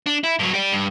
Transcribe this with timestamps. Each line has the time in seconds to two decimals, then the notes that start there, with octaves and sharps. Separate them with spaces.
0.06 D4
0.24 E4
0.39 G2 F#3
0.54 G4 D5
0.72 G2